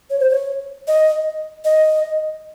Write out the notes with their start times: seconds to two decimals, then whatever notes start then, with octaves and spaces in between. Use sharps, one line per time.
0.10 C#5
0.20 C5
0.30 C#5
0.88 D#5
1.65 D#5